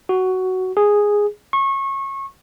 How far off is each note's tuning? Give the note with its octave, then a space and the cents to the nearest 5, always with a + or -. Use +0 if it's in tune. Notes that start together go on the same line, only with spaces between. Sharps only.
F#4 +10
G#4 -5
C#6 -25